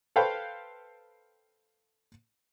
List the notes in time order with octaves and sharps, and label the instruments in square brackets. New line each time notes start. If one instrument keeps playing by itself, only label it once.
[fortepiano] A4 B4 C5 F5 G5 B5